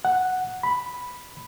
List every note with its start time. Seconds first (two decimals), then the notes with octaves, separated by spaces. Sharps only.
0.05 F#5
0.63 B5